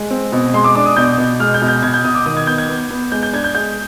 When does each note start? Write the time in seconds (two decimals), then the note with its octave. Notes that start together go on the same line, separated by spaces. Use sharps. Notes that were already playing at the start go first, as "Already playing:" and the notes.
Already playing: G#3
0.10 C4
0.32 B2
0.54 G#3 C6
0.64 D6
0.75 D4 D6
0.86 D#6
0.96 B2 G6
1.18 B2
1.40 G#3 F6
1.54 G6
1.62 B2
1.68 G6
1.82 B2 G#6
1.94 G6
2.04 B2 D#6
2.15 D6
2.26 D#3 D#6
2.37 G#6
2.47 B3 G6
2.58 G#6
2.69 B3
2.90 B3
3.12 G#3 G6
3.23 G6
3.33 D4 G#6
3.44 G6
3.55 G#3 G6